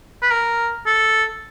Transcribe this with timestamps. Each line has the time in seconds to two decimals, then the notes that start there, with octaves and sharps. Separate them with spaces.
0.22 B4
0.31 A#4
0.86 A4